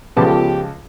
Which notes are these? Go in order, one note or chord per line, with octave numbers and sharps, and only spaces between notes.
C#2 C#3 F3 B3 F4 G4 A4 A5